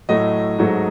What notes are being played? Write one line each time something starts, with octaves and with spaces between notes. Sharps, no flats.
A2 F#3 A3 D#5
G#2 F#3 A3